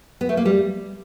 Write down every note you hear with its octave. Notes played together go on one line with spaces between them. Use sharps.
B3
A3
A#3
G3